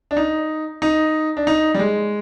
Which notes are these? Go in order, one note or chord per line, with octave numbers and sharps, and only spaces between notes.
D4
D#4
D#4
D4
D#4
G3
G#3